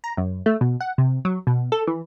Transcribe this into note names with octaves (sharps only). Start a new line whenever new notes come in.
A#5
F#2
A3
B2
F#5
C3
F#3
B2
A4
E3